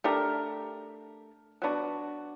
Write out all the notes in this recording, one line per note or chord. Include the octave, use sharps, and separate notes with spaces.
A3 D4 G4 A#4
F#3 B3 D4 F#4